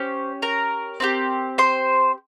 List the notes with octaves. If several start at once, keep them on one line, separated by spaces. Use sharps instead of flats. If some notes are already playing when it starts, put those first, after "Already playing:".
Already playing: C#4 G4 C5
A#4 A#5
C4 E4 G4
C5 C6